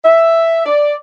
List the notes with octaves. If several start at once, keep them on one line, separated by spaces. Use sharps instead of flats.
E5
D5